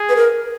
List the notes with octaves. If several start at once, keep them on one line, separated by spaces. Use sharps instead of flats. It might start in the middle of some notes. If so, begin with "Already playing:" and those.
Already playing: G#4
B4
A#4